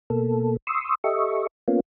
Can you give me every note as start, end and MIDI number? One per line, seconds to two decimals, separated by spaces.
0.10 0.57 47
0.10 0.57 58
0.10 0.57 69
0.67 0.95 84
0.67 0.95 85
0.67 0.95 87
0.67 0.95 88
1.04 1.47 67
1.04 1.47 69
1.04 1.47 75
1.04 1.47 76
1.04 1.47 85
1.68 1.80 58
1.68 1.80 59
1.68 1.80 61
1.68 1.80 65